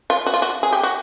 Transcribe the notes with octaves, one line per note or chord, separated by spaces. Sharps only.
F4
F#4
F4
F#4
G#4
G4
F#4